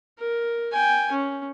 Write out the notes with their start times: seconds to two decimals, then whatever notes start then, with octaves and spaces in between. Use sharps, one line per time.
0.19 A#4
0.72 G5 G#5
1.12 C#4